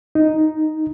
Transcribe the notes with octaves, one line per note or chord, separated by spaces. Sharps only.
D#4